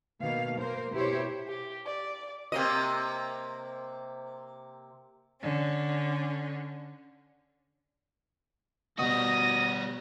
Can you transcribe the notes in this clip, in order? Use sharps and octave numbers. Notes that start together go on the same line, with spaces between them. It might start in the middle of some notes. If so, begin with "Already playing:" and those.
B2 D#3 A#3 F5
A#3 A#4 C5
B2 E4 G4 C5 C#5
G4
D5
C3 A#3 D#5
D3 C#4
B2 G3 F#4 D#6 A#6